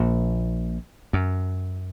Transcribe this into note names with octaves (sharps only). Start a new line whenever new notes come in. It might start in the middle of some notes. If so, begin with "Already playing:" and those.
Already playing: A#1 A#2
F#2